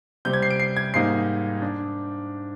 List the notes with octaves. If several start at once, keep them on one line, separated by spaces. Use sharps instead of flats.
C3 G3 C4 G6
G#6
C7
D7
C7
G#6
G#2 G3 A#3 D#4 C7
D4